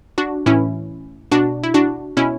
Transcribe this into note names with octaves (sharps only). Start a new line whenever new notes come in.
D4 F#4
A2 E3 C#4 E4
B2 D4 F#4
E4
D4 F#4
B2 C#4 E4